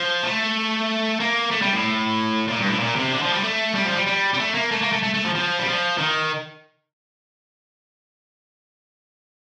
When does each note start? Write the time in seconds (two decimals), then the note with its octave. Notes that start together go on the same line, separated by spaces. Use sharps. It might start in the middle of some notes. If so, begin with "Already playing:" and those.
Already playing: F3
0.24 A3
1.20 A#3
1.51 A3
1.62 G3
1.74 A2
2.48 A#2
2.58 G2
2.68 A2
2.79 A#2
2.95 C3
3.11 D3
3.22 F3
3.32 G3
3.44 A3
3.75 G3
3.85 F3
3.96 G3
4.06 G3
4.33 G3
4.39 A3
4.54 A#3
4.71 A3
4.82 A#3
4.93 A3
5.03 A3
5.14 A3
5.24 F3
5.35 F3
5.59 G3
5.66 F3
5.98 D#3